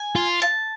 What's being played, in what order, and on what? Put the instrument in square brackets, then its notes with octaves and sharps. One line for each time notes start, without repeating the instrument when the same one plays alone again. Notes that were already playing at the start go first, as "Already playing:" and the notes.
Already playing: [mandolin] G#5
[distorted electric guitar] F4
[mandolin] A5